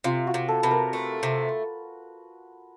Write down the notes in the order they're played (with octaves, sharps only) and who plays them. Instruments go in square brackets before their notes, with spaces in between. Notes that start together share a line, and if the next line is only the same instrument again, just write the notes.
[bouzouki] C3 [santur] F4
[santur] F#4
[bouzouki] C3
[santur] A4
[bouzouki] C3 [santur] B4
[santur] A#4
[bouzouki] A3 [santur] B4
[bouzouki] C3